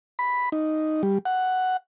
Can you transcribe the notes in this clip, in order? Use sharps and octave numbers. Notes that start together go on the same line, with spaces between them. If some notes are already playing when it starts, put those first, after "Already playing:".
B5
D#4
G3
F#5